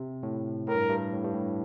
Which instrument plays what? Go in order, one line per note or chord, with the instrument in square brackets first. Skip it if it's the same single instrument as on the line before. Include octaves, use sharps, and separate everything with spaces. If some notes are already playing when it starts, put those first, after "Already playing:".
Already playing: [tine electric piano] C3
A2
[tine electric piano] A2 [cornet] A#4
[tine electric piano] G2
G2
A2
G2
A2